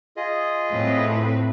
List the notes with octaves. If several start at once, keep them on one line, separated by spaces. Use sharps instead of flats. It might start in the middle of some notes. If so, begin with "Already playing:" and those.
F4 G#4 D#5
A2 C4 B4